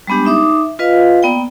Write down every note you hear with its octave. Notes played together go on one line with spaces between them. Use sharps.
G3 G#3 B3 D4 G4
D#4 E5 D6 D#6
F4 B4 D#5 F5
A#3 B3 D5 G5